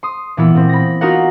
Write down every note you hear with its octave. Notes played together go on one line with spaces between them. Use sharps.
C6 D#6
A#2 E3 B3 E4
A#2 C4
B5 A#6
D#4 F4 F#4 A#4 F#5